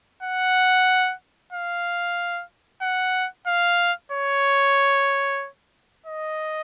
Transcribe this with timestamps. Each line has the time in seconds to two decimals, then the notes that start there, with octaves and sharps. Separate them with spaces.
0.23 F#5
1.53 F5
2.82 F#5
3.47 F5
4.12 C#5
6.06 D#5